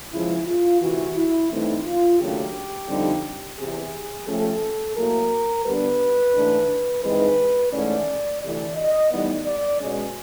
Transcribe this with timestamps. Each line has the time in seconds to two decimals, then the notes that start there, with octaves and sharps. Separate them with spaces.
0.12 E2 C#3 F3 G#3 E4
0.47 F4
0.81 D2 C3 E3 F#4
1.16 E4
1.51 G2 E3 A3 C4 D#4 E4
1.85 F4
2.20 D#2 C#3 F#3 A3 D4 G4
2.88 F2 D3 G3 C4 D#4
3.58 E2 C3 E3 G#4
4.27 C3 F3 A3 C#4 A4
4.96 A2 F#3 A#3 A#4
5.65 D3 G3 B3 D4 B4
6.34 G#2 E3 A3 D4
7.04 G2 E3 G#3 C4 D#4 B4
7.73 G#2 E3 A3 C#4 D5
8.41 D2 C3 E3 A3 D5
8.77 D#5
9.11 A2 E3 G3 B3 D#4 D5
9.46 D5
9.81 B2 G#3 C#4